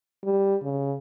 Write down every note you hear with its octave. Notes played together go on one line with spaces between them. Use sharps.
G3
C#3